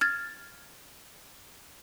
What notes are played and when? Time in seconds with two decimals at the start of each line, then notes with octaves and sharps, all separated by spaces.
0.01 F6 G#6 A6